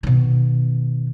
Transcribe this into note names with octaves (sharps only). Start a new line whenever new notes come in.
B2 D#3